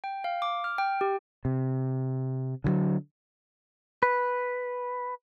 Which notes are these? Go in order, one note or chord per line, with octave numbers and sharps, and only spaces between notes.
G5
F5
D6
F6
G5
G4
C3
D3 D#3 F#3
B4